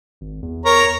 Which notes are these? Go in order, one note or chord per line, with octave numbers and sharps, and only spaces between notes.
G#1
E2
A#4 C#5 A#5